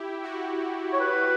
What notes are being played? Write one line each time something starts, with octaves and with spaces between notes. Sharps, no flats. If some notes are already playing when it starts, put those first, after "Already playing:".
Already playing: E4 G4
F#4
C#5
B4